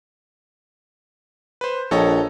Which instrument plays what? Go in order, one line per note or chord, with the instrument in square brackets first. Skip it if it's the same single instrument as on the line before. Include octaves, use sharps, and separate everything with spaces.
[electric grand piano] B4 C5
[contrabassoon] A#1 [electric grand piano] A4 C#5 D#5